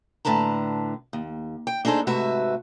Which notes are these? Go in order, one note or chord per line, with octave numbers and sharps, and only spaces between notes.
A2 D3 B4 A5 A#5
D#2
G5
D4 D#4 G#4 A4 C5
G#2 C3 A3 F#4 B4 E5